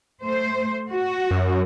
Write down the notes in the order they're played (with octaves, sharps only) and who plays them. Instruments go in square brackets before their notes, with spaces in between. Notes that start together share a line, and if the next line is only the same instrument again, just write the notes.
[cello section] A3 C5
F#4
[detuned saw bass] F#2